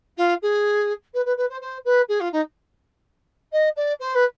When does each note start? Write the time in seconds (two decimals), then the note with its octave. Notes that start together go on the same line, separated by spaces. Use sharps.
0.17 F4
0.42 G#4
1.14 B4
1.25 B4
1.37 B4
1.49 C5
1.61 C5
1.85 B4
2.08 G#4
2.20 F4
2.32 D#4
3.52 D#5
3.76 D5
3.99 C5
4.15 B4